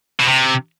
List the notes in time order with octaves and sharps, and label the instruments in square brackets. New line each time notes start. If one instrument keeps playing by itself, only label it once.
[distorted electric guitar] B2
C3